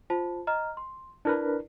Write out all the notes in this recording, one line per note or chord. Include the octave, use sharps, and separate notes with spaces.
F4 C5 A5
D#5 A#5 F6
C6
D4 E4 A#4 B4 D5